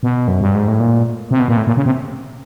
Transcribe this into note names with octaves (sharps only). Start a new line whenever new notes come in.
B2
F#2
G2
G#2
A2
A#2
C3
B2
A#2
A2
A#2
C#3
C3